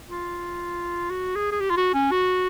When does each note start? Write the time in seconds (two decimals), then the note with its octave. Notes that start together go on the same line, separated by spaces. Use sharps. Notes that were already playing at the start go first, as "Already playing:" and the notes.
0.08 F4
1.10 F#4
1.36 G#4
1.51 G#4
1.60 G4
1.70 F4
1.77 F#4
1.94 C#4
2.11 F#4